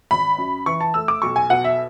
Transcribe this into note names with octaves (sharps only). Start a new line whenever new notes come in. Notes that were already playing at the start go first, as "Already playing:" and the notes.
G#1 B5
F#2
E3 C#6
A5
A3 E6
D6
B1 C#6
G#5
B2 F#5
E5